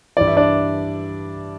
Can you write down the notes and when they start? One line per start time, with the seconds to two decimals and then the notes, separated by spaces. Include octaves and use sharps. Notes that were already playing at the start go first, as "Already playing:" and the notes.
0.17 G2 E3 D5
0.27 E5
0.37 D4 D5